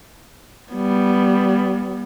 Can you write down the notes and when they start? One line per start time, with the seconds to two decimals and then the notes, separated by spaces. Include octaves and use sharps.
0.73 G3 B3